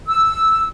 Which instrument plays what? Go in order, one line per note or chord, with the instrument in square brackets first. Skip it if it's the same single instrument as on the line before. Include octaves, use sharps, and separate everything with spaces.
[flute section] E6